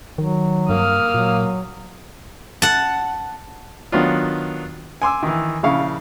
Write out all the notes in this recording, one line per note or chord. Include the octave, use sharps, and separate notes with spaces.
D#3 F#3
G2 A#3 D#6 F6
A#2 F#3
F#5 A5
D#3 F#3 B3 D4 F4
G#5 C6 D6 E6
D#3 E3
A#1 C#3 E4 F5 C#6